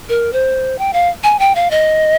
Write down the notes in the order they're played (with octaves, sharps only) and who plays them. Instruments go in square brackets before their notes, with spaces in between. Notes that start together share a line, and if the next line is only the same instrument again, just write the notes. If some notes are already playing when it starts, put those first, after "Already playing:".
[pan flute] A#4
C5
G5
F5
G#5
G5
F5
D#5